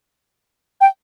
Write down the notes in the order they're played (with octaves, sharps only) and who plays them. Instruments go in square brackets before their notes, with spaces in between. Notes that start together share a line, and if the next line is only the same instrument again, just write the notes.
[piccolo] G5